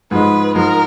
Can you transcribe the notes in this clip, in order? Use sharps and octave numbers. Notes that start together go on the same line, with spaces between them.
G#2 F3 G#3 B4
G#2 F3 G#3 A#4